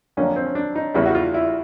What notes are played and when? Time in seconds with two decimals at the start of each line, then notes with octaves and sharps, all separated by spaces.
0.17 F2 D3 F#3 A#3 C#4
0.36 C4
0.46 C#4
0.55 D4
0.75 D#4
0.94 E2 C#3 E3 G3 E4
1.06 F#4
1.15 F4
1.34 E4